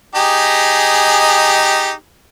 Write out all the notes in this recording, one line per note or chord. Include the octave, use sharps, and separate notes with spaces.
D#4 G4 G#4